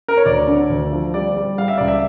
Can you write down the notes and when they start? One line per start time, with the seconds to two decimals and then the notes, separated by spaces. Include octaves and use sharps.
0.08 A#4
0.17 C#5
0.26 D2 D5
0.47 D3
0.70 D2
0.92 F3
1.14 G3 D5
1.36 G3
1.58 G3 F5
1.68 E5
1.78 C#2 D5
1.88 E5